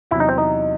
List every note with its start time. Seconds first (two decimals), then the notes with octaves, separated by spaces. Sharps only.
0.11 E2 C3 F#3 E4
0.20 D#4
0.29 C4
0.38 D#4